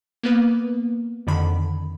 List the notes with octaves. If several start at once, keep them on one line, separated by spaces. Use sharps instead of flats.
A#3 B3 B4
F2 D3 D#3 B5